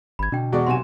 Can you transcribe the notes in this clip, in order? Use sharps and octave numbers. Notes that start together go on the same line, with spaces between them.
G#1 B5 G#6
B2 D3 D4 G5
E2 G#3 F#4 D5
B1 C3 G#5 C6 E7